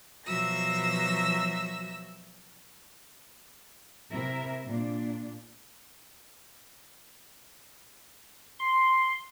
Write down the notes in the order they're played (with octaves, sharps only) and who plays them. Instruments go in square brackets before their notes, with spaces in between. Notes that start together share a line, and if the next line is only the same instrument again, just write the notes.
[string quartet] B2 F3 F#3 E5 E6 A#6
[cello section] C3 E4 A#4 E5
A#2 D4
[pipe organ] C6